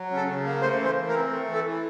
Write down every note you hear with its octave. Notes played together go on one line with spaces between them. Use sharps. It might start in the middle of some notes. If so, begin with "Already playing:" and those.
Already playing: F#3
C#3
A4
C#3
A#3
A3 C5
E3
C5
E3
A#4
C4
A3
E3 A4
E3